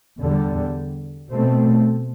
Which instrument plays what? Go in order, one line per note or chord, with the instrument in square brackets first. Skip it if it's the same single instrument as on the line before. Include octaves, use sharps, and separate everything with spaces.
[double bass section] E2 D3 G3
B2 A3 C4